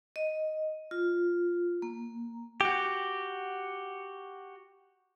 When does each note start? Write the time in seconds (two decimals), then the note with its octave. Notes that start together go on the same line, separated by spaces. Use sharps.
0.16 D#5
0.91 F4
1.82 A#3
2.61 F#4 G4